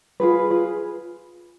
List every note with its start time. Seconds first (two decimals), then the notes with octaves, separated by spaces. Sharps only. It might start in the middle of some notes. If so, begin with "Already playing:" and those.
0.20 F4 G#4 B4
0.50 F4 G#4 B4